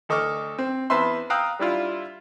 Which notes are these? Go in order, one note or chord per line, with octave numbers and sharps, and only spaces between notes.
D2 A4 D#5 C#6 D6 F6
C4
E2 B4 C5 E5 C6
F5 G5 A#5 D#6 E6 F#6
G3 D4 E4 F4